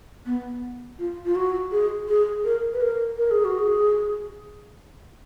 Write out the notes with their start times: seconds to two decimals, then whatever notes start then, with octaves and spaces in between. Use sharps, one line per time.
0.26 B3
0.99 F4
1.26 F4
1.35 F#4
1.71 G#4
2.08 G#4
2.45 A#4
2.73 B4
2.81 A#4
3.17 A#4
3.31 G#4
3.45 F#4
3.59 G#4